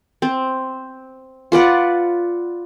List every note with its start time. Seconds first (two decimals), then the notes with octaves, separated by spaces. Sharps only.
0.22 C4
1.52 F4 B4 D5 F#5